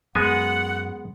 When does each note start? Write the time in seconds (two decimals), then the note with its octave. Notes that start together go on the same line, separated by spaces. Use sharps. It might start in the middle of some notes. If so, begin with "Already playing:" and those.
0.15 F#2 G#3 B3 F#5 G#5